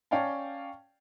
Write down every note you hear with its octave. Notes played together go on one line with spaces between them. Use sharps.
C#4 D5 F5 G5 A5